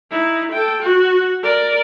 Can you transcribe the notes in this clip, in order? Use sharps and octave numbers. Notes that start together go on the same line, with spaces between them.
D#4 E4
A4 G5
F#4
A#4 D5